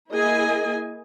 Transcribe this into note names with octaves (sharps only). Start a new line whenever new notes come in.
A#3 E4 G#4 D#5 G#5